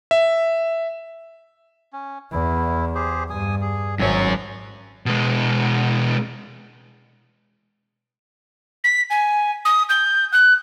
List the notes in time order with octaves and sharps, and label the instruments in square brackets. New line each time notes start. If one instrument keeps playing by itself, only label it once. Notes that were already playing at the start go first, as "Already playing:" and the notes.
[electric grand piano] E5
[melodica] C#4
[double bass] E2 [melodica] E4
[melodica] G4 G#4 C5
[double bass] G2 [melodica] G#5 D#6
[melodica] G#4
[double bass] G#1 [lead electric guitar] F#2 C#5 [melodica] C4 G#5
[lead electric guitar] B2 G#3
[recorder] B6
G#5
D#6
G6
F#6